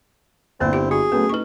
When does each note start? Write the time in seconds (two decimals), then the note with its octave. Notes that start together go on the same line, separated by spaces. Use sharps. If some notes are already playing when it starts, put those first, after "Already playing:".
0.60 G1 D3 A#3 C4 D4 E4
0.73 G4 G5
0.91 F#4 G#4
1.12 F#3 A3 B3 C#4
1.29 A3 D#4 B4 C#6